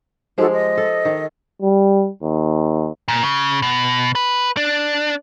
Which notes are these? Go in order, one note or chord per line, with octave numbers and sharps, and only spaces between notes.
F3 G#3 D#4 F#4 G4 A4
D#5
A4
D#3
G3
D#2
A#2
C#3
B2
B4
D4